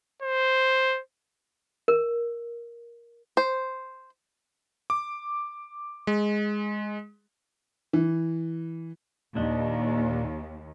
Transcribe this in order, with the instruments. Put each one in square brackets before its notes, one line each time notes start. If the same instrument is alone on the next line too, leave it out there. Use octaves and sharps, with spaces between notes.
[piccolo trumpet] C5
[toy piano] A#4
[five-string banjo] C5
[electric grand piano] D6
G#3
[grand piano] E3
[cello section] D#2 [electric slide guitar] A#2 D4 D#5